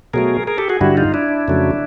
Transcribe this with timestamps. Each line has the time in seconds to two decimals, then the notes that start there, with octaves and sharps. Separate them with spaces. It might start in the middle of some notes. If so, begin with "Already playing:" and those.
0.14 B2 F#3 A3 G#4 A#4
0.47 G#4 A#4
0.58 G4 A4
0.69 F#4 G#4
0.81 G2 D3 G3 E4 F#4
0.97 D#4 F4
1.14 D4 E4
1.48 F2 C#3 F#3 A3